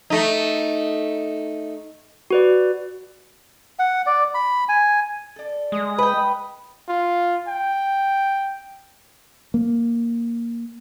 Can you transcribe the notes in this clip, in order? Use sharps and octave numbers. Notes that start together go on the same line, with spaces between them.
A3 D#4
F#4 B4 D5
F#5
D5
B5
G#5
A4 D5
G#3 D#6
B4 G5
F4
G5
A#3